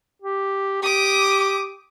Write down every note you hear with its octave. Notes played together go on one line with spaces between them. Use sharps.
G4
G4 D6 D#6